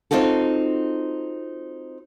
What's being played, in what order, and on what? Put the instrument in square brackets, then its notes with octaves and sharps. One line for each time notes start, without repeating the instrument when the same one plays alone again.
[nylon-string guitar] C4 D#4 F4 F#4 A4